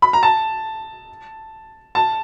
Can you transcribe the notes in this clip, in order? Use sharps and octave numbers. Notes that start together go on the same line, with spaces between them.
B5
A#5
A5
A5